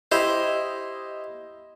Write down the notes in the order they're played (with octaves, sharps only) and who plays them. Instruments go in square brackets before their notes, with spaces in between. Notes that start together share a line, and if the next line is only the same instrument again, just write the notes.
[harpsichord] E4 G4 C5 [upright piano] D#5